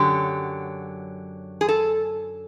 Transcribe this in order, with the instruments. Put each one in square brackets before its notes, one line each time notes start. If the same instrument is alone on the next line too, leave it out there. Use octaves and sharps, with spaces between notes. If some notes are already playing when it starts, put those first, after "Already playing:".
Already playing: [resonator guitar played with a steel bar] F#2 D3 F#3 G4
G#4
A4